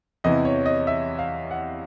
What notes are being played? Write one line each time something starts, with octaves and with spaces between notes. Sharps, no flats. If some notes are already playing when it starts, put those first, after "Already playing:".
E2 C3 E3 D#5
C#5
D#5
E5
F5
F#5